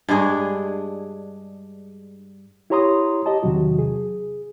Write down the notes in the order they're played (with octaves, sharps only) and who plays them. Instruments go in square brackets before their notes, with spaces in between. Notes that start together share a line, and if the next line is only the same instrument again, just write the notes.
[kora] G2 G#3 D4 G#4
[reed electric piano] E4 G4 C#5 A#5 C6 D#6
G4 D#5 A5
E2 C3 D#3 F#3 F#4
G#4